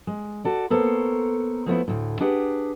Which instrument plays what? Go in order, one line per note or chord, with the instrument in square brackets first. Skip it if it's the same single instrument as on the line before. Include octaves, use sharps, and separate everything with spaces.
[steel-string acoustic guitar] G#3
F#4 A4 D5
A#3 B3 A4 A#4 C5 C#5
F3 A3 B3 E4
D2 A2
D4 G4 G#4 B4 F#5